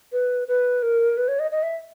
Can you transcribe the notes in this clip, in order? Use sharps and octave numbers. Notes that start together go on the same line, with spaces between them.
B4
B4
A#4
B4
C#5
D#5
D#5
E5